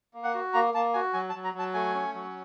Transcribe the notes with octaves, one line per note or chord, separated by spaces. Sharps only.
A#3
F#5
F#4
A#3 A#5
A#3 A5
F#4 G#5
F#3 G#5
A5
F#3
A#5
F#3 A5
A3 G#5
C#4
F#3